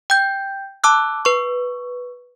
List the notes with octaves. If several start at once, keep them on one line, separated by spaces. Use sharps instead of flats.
G5 G6
A5 D6 E6 F#6
B4 C#6